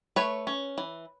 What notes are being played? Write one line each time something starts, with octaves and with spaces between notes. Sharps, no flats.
A3 B4 C#5
C#4
E3